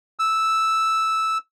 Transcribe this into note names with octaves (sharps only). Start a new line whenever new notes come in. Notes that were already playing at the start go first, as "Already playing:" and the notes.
E6